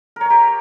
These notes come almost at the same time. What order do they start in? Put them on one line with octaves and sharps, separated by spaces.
A#4 C#5 A#5 G4